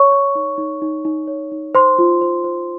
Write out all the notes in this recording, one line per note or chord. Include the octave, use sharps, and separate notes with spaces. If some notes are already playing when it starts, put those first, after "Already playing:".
Already playing: C#5 C#6
C#5
D#4
D#4
D#4
D#4
C#5
D#4
C5 C6
F4
C5
C5